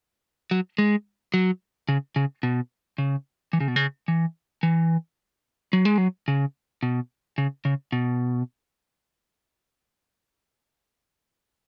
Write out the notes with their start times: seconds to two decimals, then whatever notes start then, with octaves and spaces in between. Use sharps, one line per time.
0.51 F#3
0.78 G#3
1.34 F#3
1.89 C#3
2.16 C#3
2.43 B2
2.98 C#3
3.53 E3
3.60 C#3
3.68 B2
3.76 C#3
4.08 E3
4.63 E3
5.73 F#3
5.85 G#3
5.98 F#3
6.28 C#3
6.83 B2
7.38 C#3
7.65 C#3
7.92 B2